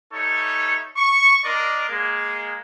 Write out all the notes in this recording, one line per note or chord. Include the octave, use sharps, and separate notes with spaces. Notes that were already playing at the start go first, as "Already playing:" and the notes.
G3 D#4 A4 C#5 E5 C#6
C#6
D4 A#4 D5 D#5 C6 D6
G#3 A#3